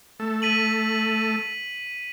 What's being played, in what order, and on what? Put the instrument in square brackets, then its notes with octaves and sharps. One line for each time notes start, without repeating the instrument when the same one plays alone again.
[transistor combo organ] A3 A4
[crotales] B6 D#7 F#7